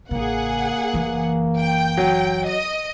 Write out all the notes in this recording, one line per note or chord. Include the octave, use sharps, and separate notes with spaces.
A1 C#3 A#3 G#4 F#5
F#1 E3
G5
F#3
D#5